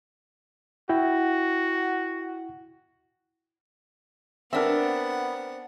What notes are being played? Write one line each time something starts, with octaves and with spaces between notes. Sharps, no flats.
E4 F#4 G5
B3 C4 D4 A#4 E5 F#5